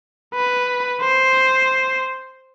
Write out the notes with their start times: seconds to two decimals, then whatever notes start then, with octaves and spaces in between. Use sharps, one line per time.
0.34 B4
1.01 C5